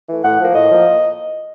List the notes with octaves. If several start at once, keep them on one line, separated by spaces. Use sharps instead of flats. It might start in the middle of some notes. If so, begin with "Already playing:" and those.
E3 A3
A2 F#5
F3 A#3
A2 D#5
F3 A#3